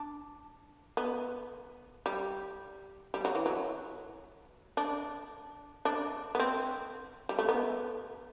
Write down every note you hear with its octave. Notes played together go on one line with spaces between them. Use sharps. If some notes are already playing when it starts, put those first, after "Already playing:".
Already playing: D4
B3
G3
G3
F#3
E3
F#3
D4
D4
B3
C4
G3
A3
B3